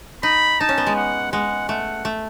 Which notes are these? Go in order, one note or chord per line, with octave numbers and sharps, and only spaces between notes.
D#4 B5
D#4 A5
C#4
B3
G#3
F#5
G#3 F#5
A3 F#5
A3